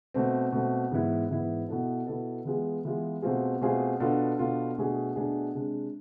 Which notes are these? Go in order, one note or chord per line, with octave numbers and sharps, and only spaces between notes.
B2 A3 C4
B2 A3 C4
G#2 E3 B3 E4
G#2 E3 B3 E4
B2 B3 E4 A4
B2 B3 E4 A4
E3 G#3 B3 F4 G#4
E3 G#3 B3 F4 G#4
B2 A3 C4 F4 G#4
B2 A3 C4 F4 G#4
B2 B3 D4 F4 A4
B2 B3 D4 F4 A4
B2 A3 D4 G#4
B2 A3 D4 G#4
C3 G#3 D4